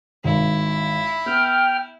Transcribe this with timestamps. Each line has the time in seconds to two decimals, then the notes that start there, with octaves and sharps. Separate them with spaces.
0.24 G#1 E4
1.26 B3 G5 F6